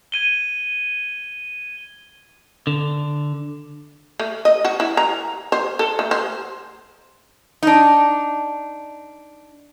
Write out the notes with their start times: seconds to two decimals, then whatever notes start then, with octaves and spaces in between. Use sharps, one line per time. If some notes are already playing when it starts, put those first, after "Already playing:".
0.12 G#6 D#7 G7
2.67 D3
4.20 A3
4.45 D#5
4.65 F#4
4.80 E4
4.97 A#5
5.52 C5
5.79 A4
5.99 A3
6.11 C5
7.63 D4 D#4